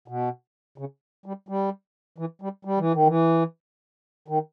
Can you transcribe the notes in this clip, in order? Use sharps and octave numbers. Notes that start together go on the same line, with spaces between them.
B2
C#3
G3
G3
E3
G3
G3
E3
D#3
E3
D#3